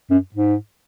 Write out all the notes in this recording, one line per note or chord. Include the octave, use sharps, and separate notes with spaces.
F#2
G#2